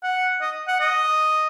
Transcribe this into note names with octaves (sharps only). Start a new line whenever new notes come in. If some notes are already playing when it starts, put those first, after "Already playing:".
F#5
D#5
F#5
D#5